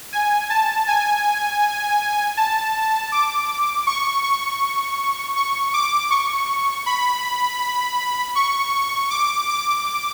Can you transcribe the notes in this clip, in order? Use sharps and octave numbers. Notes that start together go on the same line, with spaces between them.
G#5
A5
G#5
A5
D6
C#6
C#6
C#6
D6
C#6
B5
C#6
D6
D6